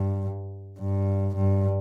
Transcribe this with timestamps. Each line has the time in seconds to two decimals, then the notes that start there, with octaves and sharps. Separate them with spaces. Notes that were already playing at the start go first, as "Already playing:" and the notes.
Already playing: G2
0.79 G2
1.36 G2